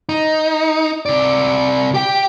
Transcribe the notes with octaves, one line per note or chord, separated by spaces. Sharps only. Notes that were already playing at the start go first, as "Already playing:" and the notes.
D#4
C3 D5
G4 G5